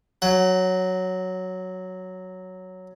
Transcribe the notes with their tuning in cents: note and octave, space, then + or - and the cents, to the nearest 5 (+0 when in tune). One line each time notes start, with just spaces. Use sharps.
F#3 +0 F#5 +30